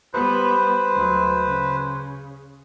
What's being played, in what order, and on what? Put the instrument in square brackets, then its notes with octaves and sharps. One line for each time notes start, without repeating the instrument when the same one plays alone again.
[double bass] G3 B3 [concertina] B4 C5
[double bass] D2 F#3
C#3